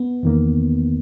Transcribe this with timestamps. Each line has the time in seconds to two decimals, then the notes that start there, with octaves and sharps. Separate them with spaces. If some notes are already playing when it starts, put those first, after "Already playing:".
Already playing: B3
0.23 E2 D#3 A#3